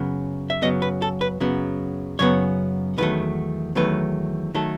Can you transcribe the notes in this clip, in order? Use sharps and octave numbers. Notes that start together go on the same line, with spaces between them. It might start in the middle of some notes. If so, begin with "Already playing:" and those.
Already playing: F#2 C#3 F#3 B3
E5
F#2 C#3 F#3 B3 D#5
B4
A4
B4
F#2 C#3 F#3 B3
F#2 C#3 F#3 B3 C#5
E2 D#3 F#3 A3 B4
E2 D#3 F#3 A3 B4
D#3 F#3 A3 A4